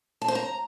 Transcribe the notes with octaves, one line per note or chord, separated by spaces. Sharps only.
A5
C5
A#5